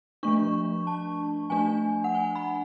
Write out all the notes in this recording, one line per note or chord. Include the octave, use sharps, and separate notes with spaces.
F3 A3 D4 C#6
A5
F3 A3 D4 G#5
F#5
G#5
B5